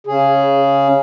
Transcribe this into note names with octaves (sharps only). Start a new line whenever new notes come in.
C#3 G#4